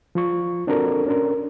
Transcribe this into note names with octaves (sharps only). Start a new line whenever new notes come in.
F3 F4 C#6
C4 D4 F#4 A4 A#4
C#4 D4 A#4